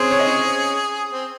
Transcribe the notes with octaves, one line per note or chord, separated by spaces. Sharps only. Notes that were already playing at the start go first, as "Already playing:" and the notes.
Already playing: G#3 C4 C#4 G#4 C5
C#5
D#5
C#4 C#5
C4